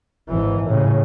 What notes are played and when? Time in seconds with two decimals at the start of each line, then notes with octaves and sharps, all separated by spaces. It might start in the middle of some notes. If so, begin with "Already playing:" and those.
0.29 G#1 E3
0.68 A2 C#3